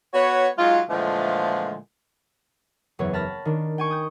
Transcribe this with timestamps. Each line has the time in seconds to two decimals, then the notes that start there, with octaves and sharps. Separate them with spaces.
0.14 B3 F#4 B4 C#5
0.58 F#3 G#3 D#4 F4
0.90 A#2 D3 E3 F3 G#3 A3
2.99 F#1 E2 E3 B3 C#5
3.13 A5 B5 F6 A6 A#6
3.45 D#3 D4
3.78 G5 G#5 C#6
3.91 D#6 G6